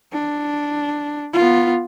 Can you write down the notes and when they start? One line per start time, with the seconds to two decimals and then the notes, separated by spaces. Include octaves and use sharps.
0.13 D4
1.33 B3 F4